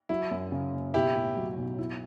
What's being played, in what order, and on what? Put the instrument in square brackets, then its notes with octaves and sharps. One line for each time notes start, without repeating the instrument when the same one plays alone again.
[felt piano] F#3 [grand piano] E4
[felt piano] F#2
C#3
F#1
[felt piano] B1 [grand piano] E4 G4
[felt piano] A2
F#3
B1
E4